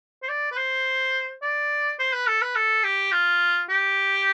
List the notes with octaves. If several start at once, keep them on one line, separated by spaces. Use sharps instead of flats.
C5
D5
B4
C5
D5
C5
B4
A4
B4
A4
G4
F4
G4